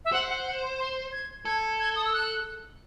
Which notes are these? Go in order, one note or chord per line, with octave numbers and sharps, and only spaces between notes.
E5
C5 F#5
F#5
F#5
C6
C6
G#6
A4 G#6
G#6
D#6
E6
F#6